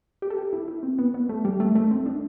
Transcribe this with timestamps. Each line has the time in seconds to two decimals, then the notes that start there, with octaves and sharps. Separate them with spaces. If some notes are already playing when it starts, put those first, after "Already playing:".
0.22 G4
0.30 A4
0.38 G4
0.53 E4
0.68 E4
0.83 C4
0.99 B3
1.14 B3
1.29 A3
1.45 G3
1.60 A3
1.75 A3
1.91 C4
2.06 D4